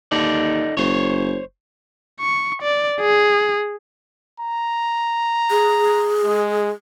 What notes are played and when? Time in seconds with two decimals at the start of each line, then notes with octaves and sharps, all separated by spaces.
0.12 D#2 D#4 A4 D5
0.77 F#1 C5 C#5
2.21 C#6
2.62 D5
3.01 G#4
4.40 A#5
5.50 G#4
6.24 G#3